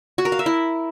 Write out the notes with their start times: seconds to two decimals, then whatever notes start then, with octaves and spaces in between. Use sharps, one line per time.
0.18 F#4
0.25 A#4
0.32 F5
0.39 E5
0.46 E4